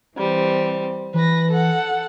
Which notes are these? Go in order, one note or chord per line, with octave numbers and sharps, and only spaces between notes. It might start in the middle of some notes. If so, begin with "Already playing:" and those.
E3 G3 C4
E3 B4 A#6
A4 F#5